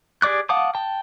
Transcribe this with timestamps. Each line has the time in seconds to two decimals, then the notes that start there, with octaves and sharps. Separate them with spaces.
0.22 G4 G#4 D5 D6 F#6
0.49 F5 F#5 A5 D6 D#6
0.75 G5 A5